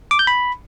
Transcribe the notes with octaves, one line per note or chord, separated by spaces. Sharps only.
D6
G6
B5